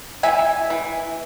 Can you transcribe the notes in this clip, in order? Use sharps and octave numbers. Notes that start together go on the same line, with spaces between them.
E3 E5 G#5
E3